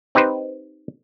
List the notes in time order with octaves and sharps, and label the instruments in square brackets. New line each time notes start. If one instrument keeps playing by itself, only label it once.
[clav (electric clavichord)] C4 D#4 G4 B4 C5